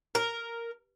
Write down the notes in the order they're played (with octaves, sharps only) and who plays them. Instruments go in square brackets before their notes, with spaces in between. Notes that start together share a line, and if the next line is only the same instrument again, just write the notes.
[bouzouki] A#4